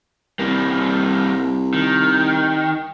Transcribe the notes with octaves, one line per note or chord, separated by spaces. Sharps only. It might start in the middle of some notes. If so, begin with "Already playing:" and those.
C2 G3 A#3
D#3